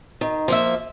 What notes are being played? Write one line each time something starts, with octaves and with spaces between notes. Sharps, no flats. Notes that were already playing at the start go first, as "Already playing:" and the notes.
D#3
F3 A#3 E5